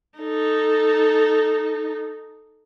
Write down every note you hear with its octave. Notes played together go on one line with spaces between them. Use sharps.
D#4 A4